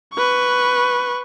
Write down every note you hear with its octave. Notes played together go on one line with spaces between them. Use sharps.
B4 C#6